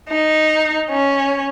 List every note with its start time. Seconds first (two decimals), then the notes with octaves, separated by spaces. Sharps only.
0.10 D#4
0.90 C#4